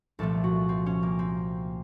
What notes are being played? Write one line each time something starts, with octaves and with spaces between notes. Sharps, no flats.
C2 A#2 F3 A3 A4
F#4
C4
C#4
A#3
C4